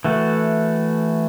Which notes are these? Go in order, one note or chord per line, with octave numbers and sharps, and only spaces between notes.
E3 A3 F#4